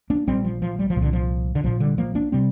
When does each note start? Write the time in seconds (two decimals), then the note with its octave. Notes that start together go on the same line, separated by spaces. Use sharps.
0.10 A#3 D4
0.27 A#1 A#2 G3 C4
0.45 F3
0.62 F3
0.79 G3
0.90 F3
0.96 C2 A#2
1.02 D3
1.13 F3
1.55 D3
1.64 A#1 A#2 F3
1.80 D3 G3
1.98 F3 A#3
2.15 A#3 D4
2.32 C3 G3 C4